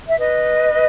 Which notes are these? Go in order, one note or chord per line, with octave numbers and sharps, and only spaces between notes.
E5
B4 D#5